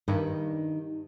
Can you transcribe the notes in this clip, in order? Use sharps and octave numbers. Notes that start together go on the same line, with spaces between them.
G2 D#3